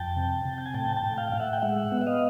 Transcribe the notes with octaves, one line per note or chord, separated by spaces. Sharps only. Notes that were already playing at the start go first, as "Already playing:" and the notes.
Already playing: F2 G5 A5
C3
C3
G5
G#5
A2 G5 A5
G5 A5
A2
F5 G5
A2 F5
E5 F#5
G5
G#3 E5 F#5
B3
E5
D#5 F5